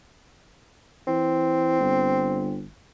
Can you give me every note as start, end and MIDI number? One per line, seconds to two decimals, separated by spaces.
1.07 1.79 52
1.07 2.62 60
1.80 2.67 31